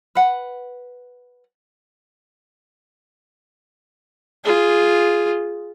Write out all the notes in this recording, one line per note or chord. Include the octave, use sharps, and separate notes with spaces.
B4 F#5
F4 G#4